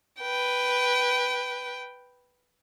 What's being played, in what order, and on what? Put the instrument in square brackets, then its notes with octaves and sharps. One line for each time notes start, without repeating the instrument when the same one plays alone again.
[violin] B4 G5